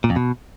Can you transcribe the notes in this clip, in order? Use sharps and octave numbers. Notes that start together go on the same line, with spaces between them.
A#2
F2
B2